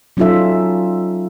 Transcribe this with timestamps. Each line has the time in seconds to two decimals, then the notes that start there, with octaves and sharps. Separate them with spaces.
0.17 F#3 C#4 D#4 F4 A4 E5